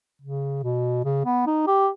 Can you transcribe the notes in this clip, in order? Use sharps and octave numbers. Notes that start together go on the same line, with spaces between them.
C#3
B2
C#3
B3
D#4
G4